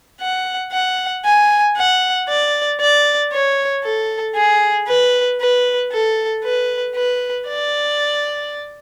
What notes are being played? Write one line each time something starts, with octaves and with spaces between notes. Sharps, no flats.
F#5
F#5
G#5
F#5
D5
D5
C#5
A4
G#4
B4
B4
A4
B4
B4
D5